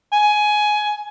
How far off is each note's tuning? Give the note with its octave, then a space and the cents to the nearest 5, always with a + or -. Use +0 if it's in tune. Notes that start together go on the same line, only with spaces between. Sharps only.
G#5 +15